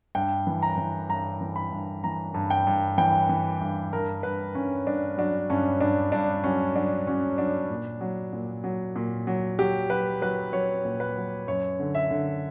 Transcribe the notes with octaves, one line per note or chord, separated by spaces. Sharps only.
G2 G5
E3
A#5
E3
G2 A#5
E3
B5
G2
E3 A#5
G2
G5
G2
E3 G5
E3
G2
G2 A#4
G2 B4
G2 C#4
G2 D4
F#3 D4
G2 C#4
G2 D4
G2 D4
F#3 C#4
F#3 D4
F#3 C#4
F#3 D4
A#2
F#3
A#2
F#3
A#2
F#3
F#3 G4
F#3 B4
F#3 B4
F#3 C#5
A#2
B4
F#3
F#2 C#5
D3
E5
D3